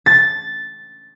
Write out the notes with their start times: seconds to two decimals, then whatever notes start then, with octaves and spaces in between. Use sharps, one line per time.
0.06 A6